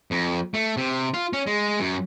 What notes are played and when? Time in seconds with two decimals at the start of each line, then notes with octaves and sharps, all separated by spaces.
0.11 F2
0.54 A3
0.77 C3
1.14 F4
1.33 C#4
1.47 G#3
1.80 F#2